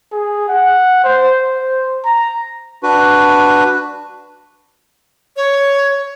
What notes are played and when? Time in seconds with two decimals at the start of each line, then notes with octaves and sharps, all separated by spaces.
0.12 G#4
0.49 F#5
1.04 C5
1.42 C5
2.05 A#5
2.83 D4 F#4 B4
5.37 C#5